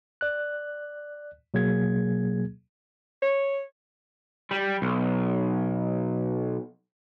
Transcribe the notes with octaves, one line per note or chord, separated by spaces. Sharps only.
D5 F#6
B2 F#3 A#3 G#4 G#6
C#5
G3
B1